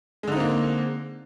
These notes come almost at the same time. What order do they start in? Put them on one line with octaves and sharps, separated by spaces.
G#3 D3 D#4 C4 A#3